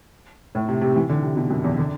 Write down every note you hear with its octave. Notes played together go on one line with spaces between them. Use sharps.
A2
C3
C3
E3
D3
C3
B2
F#2
E2
D3